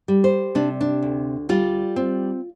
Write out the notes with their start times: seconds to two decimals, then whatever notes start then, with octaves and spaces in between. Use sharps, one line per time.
0.08 G3
0.24 C5
0.55 C3 D4
0.81 D4
1.02 D2
1.49 G3 F4
1.96 C4